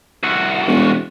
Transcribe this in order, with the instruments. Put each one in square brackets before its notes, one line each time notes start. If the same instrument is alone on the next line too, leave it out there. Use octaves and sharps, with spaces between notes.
[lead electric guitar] C2 F#4
[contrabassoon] E1